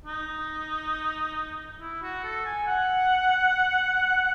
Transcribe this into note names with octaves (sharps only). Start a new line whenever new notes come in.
D#4
E4
F#4
A4
G#5
F#5